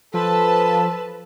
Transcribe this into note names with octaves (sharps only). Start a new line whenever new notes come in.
F3 A4 B4 A5